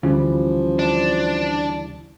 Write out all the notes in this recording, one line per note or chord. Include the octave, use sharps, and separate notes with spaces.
D2 C#3 E3 F3 G3
D4